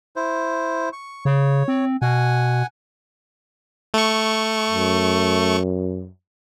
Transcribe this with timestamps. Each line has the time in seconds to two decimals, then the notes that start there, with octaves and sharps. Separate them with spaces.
0.16 E4 C5
0.93 C#6
1.25 C#3 C#5
1.68 C4
2.02 B2 F#5 G#5
3.94 A3 C#6
4.70 F#2